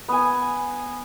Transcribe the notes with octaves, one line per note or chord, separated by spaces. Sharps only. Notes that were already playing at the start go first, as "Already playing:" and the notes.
B3 G#5